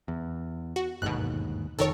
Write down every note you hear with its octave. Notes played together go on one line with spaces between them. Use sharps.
E2
F#4
G1 D#2 G#2 B2 F#6
F1 D#3 A4 A#4 C#5